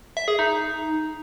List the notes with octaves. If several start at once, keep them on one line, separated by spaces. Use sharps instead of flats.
E5
G#4
D#4